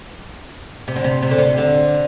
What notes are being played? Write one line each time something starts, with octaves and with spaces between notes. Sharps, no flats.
C3
D3
C3
C3
D3
C3
D3